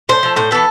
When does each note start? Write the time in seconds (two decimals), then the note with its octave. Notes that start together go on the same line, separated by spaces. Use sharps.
0.09 A2 C5
0.23 F3 A3
0.36 A2 C5
0.51 E3 B3 A4